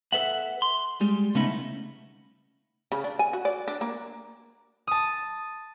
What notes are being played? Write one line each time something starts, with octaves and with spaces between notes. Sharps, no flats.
A4 B4 E5 F#5
C6
G3 G#3
C#3 A3 B3 C#4 D#4 E4
C#3
D4
G#5
F#4
D5
D4
A#3
A5 D#6